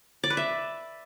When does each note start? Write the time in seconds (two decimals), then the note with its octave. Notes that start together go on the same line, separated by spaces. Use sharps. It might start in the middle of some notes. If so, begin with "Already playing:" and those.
0.24 D5
0.30 B4
0.37 E5